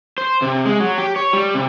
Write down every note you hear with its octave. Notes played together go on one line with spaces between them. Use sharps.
C5
C3
G#3
F#3
G4
C#5
G3
C3